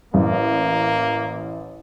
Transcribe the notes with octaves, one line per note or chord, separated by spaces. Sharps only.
A1 A#3